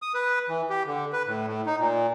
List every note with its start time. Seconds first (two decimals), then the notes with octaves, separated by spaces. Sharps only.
0.02 D#6
0.14 B4
0.49 E3
0.70 G4
0.86 D3
1.13 B4
1.27 A2
1.48 A2
1.66 D#4
1.79 A#2